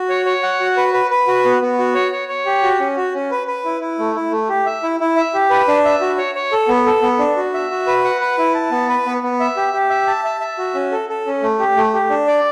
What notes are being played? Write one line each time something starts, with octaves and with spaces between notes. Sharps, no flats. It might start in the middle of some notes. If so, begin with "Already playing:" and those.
Already playing: F#4
C#5
C#5
F#5
F#4
B4
B4
B4
F#4
B3
B3
F#4
C#5
C#5
C#5
G4
F#4
C#4
F#4
C#4
B4
B4
E4
E4
A3
E4
A3
G4
E5
E4
E4
E5
G4
B4
D4
E5
F#4
C#5
C#5
A4
B3
A4
B3
D4
F#4
E5
F#4
B4
F#5
B4
E4
A5
B3
B4
B3
B3
E5
G4
G4
E5
A5
E5
E5
F#4
C#4
A4
A4
C#4
A3
G4
A3
G4
D4
D5